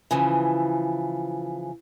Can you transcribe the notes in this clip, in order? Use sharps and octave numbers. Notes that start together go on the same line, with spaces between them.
C#3 E3 F3